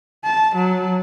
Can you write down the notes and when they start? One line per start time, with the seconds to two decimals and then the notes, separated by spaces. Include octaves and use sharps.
0.24 A5
0.56 F#3